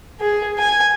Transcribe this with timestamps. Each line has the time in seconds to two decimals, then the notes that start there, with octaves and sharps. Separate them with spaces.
0.21 G#4
0.59 G#5